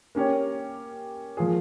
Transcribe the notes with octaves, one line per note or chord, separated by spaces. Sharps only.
A#3 C#4 G4 A#4 C#5
F3 A#3 F4 G#4